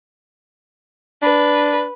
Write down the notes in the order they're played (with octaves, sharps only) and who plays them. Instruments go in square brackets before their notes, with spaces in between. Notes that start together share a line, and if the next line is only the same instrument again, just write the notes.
[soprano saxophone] D4 [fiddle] B4